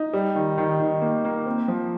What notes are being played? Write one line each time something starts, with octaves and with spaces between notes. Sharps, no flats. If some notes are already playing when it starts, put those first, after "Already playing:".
Already playing: D#4
G3
D#3
D#3
D#3
A#3
A#3
C4
F3